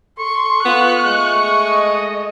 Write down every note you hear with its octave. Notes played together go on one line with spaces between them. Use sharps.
A4 C6 C#6
B3 F4 F#6
G#3 A3
D#5